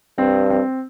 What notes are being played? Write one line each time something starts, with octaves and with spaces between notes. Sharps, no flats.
G2 C4
C4